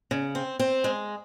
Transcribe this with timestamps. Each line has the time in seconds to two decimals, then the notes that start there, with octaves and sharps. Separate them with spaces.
0.11 C#3
0.35 C4
0.59 C4
0.84 G#3